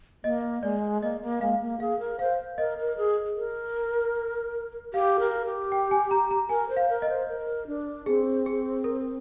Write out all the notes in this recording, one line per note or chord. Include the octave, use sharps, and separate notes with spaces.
A#3 D#5
G#3 D5
A#3 D#5
A#3
G#3 F5
A#3
G#4 F5
A#4
C5 F5
A#4 D#5
A#4
G#4
A#4
G4 F5
A#4
G4
G5
G#5
A#5
A#5
A#4 G#5
C5
F5
A#4
D#5
C5
A#4
D4
C4 G#4
G#4
A#4